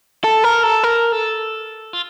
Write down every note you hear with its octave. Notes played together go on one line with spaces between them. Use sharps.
A4
A#4
A4
A#4
A4
F4